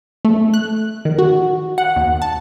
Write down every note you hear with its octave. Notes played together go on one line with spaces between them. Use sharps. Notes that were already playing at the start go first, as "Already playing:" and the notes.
A3
F#6
D#3
F#4
F#5
D#2
A5